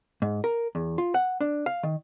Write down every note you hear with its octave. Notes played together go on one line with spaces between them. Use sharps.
G#2
A#4
E2
F4
F#5
D4
F5
D#3